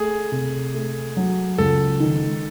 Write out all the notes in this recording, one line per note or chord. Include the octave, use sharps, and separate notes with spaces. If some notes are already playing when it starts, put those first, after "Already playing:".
Already playing: A3 G#4
C3
A3
F#3
C#2 A4
D#3